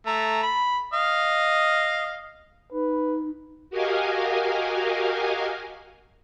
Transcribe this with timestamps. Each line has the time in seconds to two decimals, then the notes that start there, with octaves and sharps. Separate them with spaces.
0.06 A3 A#5
0.43 B5
0.94 D#5 F5
2.72 D#4 B4
3.70 F#4 G4 A#4 D#5 F5 G#5